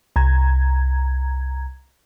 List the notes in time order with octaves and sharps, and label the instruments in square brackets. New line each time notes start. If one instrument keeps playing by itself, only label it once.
[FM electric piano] C2 A#5 G#6